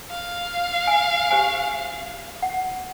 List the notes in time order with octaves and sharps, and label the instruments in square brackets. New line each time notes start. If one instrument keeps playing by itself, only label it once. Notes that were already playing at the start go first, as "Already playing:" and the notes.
[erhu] F5
[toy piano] G#5
G4 C5 G#5
F#5